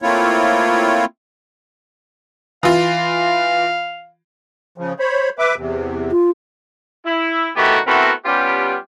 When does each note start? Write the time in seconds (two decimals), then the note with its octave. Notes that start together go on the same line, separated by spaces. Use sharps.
0.02 A3 A#3 C4 E4 F4 C#5
2.63 E3 F4 F5
4.78 C#3 F3
4.99 C5 C#5 B5
5.39 B4 E5 D6
5.56 E2 C3
6.11 F4
7.05 E4
7.56 A2 D#3 A3 B3 F#4 G4
7.86 A3 B3 C4 E4 F#4 A#4
8.25 G3 B3 C#4 F4 G4